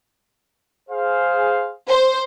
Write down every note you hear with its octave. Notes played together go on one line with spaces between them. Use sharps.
G#4 C5 F5
C5